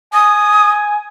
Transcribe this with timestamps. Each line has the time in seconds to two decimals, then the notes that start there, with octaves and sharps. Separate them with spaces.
0.14 G#5 D#6